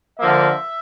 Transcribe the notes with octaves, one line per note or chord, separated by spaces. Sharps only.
D3 F3 A#3 E5